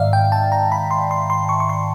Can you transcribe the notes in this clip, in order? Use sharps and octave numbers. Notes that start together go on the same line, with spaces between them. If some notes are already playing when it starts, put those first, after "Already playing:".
Already playing: G#2 D#3 D5 E5 F5
G5
A5
A#5
B5
C6
C6
C6
C#6
C#6
C6